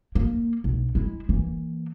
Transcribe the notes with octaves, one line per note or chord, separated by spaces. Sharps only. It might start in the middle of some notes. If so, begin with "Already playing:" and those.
A#3
B1
G#3 E4
E3 A#3